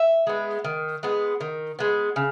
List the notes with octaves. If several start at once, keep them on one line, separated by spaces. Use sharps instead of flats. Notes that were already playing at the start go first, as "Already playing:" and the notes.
Already playing: E5
G#3 B3
D#3
G#3 B3
D#3
G#3 B3
C#3